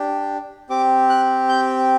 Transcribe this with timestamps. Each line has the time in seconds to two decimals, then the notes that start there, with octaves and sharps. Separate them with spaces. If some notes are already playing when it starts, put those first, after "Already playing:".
Already playing: D4 G4
0.69 C4 G4 D6
1.09 F#6
1.49 G6